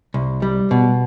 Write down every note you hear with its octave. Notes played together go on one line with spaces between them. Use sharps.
C2
G3
B2